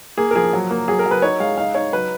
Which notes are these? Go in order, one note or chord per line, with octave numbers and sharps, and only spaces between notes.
A#3 G#4
A#4
F3 G#4
F#3
A#3
F#3 G#4
A#4
F#3
B4
D#4 C#5
G#3 F5
D#4 F5
D#4 C#5
F#3 B4